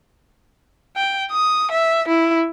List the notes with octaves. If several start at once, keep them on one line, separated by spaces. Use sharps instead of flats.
G5
D#6
E5
E4